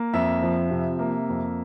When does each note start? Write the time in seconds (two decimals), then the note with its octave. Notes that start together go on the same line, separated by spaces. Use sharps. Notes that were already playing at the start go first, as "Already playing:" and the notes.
Already playing: A#3
0.13 F2 E5
0.42 F3
0.71 C3
0.99 A#3
1.29 F2